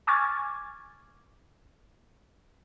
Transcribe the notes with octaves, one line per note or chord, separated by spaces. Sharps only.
G#5 C#6 D6 F6 G#6 A6